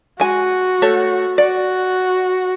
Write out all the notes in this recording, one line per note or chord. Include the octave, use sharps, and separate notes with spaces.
G#3 F#4 G#5
A3 A4 C#5
F#4 D5